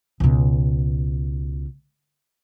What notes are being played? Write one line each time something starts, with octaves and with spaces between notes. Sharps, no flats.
C#2 B2